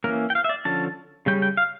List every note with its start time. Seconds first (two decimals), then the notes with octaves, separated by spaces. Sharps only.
0.04 E3 A#3 C#4 A#4
0.30 G5
0.35 F5
0.44 E5
0.49 D5
0.65 D3 F3 C#4 A5
1.26 C#3 G3 C#4 G5
1.42 G5
1.57 F5